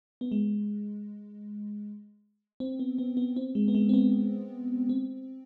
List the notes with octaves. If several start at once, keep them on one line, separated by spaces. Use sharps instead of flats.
B3
G#3
C4
B3
B3
B3
C4
G#3
B3
G#3
C4
B3
C4